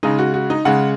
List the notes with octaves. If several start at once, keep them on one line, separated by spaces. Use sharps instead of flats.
C#3 G#3 D#4
F#4
F#4
D#4
C#3 G#3 F#5